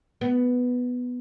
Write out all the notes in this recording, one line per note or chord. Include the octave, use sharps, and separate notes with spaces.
B3